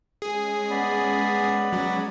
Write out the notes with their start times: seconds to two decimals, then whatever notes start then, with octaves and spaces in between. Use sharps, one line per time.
0.22 G#3 C#4 G#4
0.70 B3 D5 B5
1.72 F#3